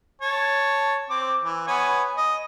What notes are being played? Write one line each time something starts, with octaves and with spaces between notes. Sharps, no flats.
C#5 A5
C4 D6
E3
B3 C#5 G#5
D#5